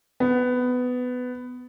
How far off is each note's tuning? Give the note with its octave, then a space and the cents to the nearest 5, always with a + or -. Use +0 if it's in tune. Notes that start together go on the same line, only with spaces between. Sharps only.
B3 +15